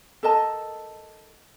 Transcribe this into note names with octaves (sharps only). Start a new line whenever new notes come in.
A4 A#4 D#5 A5